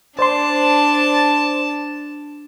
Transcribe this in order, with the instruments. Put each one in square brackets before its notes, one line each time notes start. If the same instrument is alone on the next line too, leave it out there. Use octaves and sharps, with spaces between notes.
[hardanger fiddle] D4 [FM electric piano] C5 D5 C6 [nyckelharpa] A5